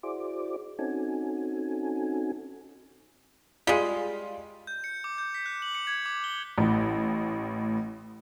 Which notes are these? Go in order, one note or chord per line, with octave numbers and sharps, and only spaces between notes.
E4 F#4 G#4 C5 D5 D6
C4 C#4 D#4 F#4 A4 G#5
G3 G#3 F4 F5
G6
C#7
D6
G6
B6
F#6
F#7
C#7
G#6
D6
G7
A1 A2